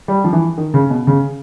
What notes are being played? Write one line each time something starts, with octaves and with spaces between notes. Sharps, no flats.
G3
F3
E3
D#3
C#3
B2
C#3